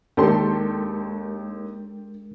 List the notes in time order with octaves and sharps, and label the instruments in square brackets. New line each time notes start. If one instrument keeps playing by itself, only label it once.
[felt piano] D#2 [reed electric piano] G#3 D4 A#4 [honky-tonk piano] G4 A4 C6